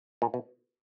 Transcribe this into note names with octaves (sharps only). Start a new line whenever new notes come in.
A#2
B2